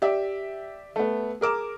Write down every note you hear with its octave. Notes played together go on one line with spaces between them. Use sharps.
G4 D5 E5
A3 B3
G#4 A#4 D6 E7